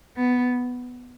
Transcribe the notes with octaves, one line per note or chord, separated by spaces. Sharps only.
B3